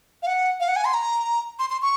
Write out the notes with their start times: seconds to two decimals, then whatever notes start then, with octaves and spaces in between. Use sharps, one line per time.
0.23 F5
0.27 F#5
0.60 F5
0.68 F#5
0.76 G#5
0.85 C6
0.94 A#5
1.59 C6
1.70 C6
1.82 C#6